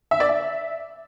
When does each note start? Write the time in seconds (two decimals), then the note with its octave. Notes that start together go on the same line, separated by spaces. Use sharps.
0.11 E5
0.20 D5
0.29 E5